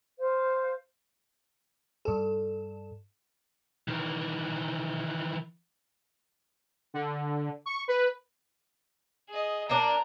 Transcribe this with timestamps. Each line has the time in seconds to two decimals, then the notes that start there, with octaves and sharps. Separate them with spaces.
0.19 C5 F5
2.05 G2 A4
3.88 D#3 E3
6.94 D3
7.66 C#6
7.88 B4
9.29 G#4 D#5
9.69 A#3 D4 D5 A#5